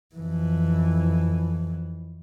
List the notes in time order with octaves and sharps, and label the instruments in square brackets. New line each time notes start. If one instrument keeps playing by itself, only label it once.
[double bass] F2 E3